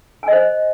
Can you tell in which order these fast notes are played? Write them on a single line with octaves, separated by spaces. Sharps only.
G#5 D#5 C5